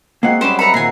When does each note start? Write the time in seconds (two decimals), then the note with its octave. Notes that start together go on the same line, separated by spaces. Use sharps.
0.23 G#3 A#3 C4 F#4 F#5 C7
0.41 F#2 G3 C#4 C5 B5 D6 E7
0.59 A#4 E5 F#5 A#5 B5 C#7
0.74 D#2 A#2 G#5 A#5 C7